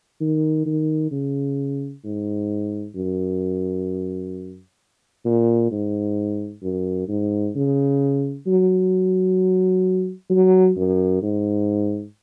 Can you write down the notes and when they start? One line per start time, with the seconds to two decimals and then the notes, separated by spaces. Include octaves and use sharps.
0.21 D#3
0.65 D#3
1.11 C#3
2.04 G#2
2.95 F#2
5.25 A#2
5.71 G#2
6.62 F#2
7.08 G#2
7.55 C#3
8.47 F#3
10.30 F#3
10.76 F#2
11.22 G#2